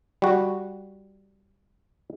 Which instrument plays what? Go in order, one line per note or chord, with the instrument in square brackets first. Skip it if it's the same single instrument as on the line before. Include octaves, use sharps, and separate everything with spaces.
[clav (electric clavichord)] G3 F#4